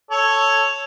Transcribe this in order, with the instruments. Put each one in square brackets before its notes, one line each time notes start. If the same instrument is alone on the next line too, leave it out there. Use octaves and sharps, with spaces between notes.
[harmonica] A4 C#5